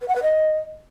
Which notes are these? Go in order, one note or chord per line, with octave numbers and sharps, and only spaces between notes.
B4
F#5
B4
D#5